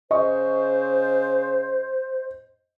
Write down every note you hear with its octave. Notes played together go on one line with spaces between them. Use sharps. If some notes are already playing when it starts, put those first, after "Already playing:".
C#3 C5 D#5 C#6